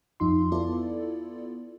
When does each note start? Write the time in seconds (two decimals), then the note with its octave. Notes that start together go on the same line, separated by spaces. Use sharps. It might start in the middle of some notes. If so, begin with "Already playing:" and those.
0.20 F2 D#4 F4 C6
0.52 B3 E4 F4 A4 D5